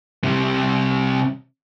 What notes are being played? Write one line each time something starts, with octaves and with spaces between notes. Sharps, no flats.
C3 G3